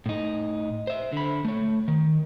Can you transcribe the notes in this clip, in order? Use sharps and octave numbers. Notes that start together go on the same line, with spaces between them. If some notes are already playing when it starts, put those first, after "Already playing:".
A2 D#4
C5 E5
D3 B5
A3 C#5
D#3